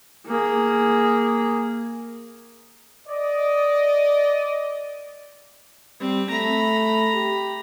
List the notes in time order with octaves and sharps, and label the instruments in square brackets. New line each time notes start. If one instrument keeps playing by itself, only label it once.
[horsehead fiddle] A#3 G#4
[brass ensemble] D5 D#5
[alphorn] G3 [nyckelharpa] C4
[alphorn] A3 [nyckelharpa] A#5 B5
[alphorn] G4